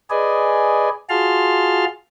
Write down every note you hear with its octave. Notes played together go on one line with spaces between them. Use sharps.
G#4 B4 D5 D#5 G#5
F4 F#4 G#4 A5 C6 F6